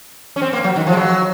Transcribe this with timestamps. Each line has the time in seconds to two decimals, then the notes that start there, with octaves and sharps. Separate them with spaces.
0.36 C#4
0.42 C4
0.53 A#3
0.64 F#3
0.76 D#3
0.87 F3
0.93 G#3
0.97 F#3